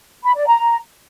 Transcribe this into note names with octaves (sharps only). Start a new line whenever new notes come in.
B5
D5
A#5